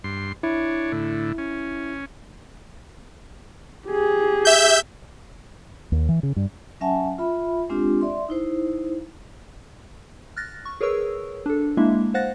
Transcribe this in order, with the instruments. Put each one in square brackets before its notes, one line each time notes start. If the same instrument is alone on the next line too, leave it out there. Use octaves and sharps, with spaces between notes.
[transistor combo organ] G2 C6
[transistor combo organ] D4 C#5 [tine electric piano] E4
[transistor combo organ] A2 D3
C#4
[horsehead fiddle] G4 G#4
[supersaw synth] E5 G6
[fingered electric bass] D#2
E3
C#3
G2
[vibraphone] F#3 C#4 E5 F#5 G#5 A5
F4 E5 B5
G#3 C4 D4 F4 G4
D5 E5 C6
D#4 E4 C5
[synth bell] F6 F#6 A6 A#6
C#6
G#4 A#4 B4 C#5 C#6 E6
D4 A4
G#3 A#3 D4 E4 E5
C5 F5 F#5 F#6 A6 A#6